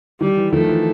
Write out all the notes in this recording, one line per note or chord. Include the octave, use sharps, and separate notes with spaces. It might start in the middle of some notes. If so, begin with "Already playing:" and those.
D#3 G3
E3
D#3 F3 A3
F3
E3